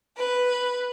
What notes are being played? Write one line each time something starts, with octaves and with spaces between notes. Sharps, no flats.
B4